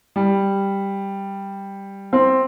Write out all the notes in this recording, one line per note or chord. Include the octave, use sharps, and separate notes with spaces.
G3
C4